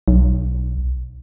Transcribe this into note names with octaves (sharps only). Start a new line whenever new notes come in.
B1